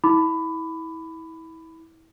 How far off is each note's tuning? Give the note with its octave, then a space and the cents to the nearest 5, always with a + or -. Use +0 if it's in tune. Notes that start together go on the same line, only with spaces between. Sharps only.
E4 -30 B5 +15 D6 +0